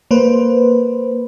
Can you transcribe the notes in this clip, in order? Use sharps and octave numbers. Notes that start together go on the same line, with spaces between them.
A#3 B4 C5